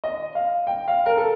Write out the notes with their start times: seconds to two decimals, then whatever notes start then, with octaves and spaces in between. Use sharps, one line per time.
0.04 D#5
0.35 F5
0.67 G5
0.88 F5
1.06 A#4
1.17 A4